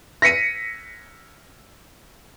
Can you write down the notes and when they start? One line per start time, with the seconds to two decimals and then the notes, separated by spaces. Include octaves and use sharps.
0.22 A#6 B6 C#7 D#7